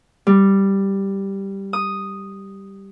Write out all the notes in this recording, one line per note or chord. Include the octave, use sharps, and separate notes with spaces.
G3
D#6